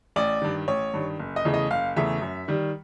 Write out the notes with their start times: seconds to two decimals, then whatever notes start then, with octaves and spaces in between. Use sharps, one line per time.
0.16 A1 D5
0.42 G2 D#3
0.68 A1 C#5
0.94 G2 D#3
1.19 F#1
1.36 D#5
1.45 E2 C#3 E3 A3
1.54 D#5
1.71 F#1 F5
1.96 E2 C#3 E3 A3 E5
2.22 F#2
2.48 D#3 G3